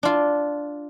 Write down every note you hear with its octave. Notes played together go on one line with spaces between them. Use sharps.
D4 F4